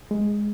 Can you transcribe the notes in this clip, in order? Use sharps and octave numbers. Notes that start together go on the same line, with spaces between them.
G#3